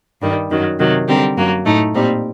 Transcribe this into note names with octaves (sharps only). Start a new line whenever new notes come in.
G2 D#3 G3
F#2 D#3 F#3
C3 D#3 F#3
D3 G3 C4 G4 A#4
F#2 F#3 A#3
A2 A3 D#4
A#2 G3 C4 D#4